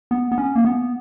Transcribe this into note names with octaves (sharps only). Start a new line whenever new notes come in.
B3
B3
C#4
A#3
B3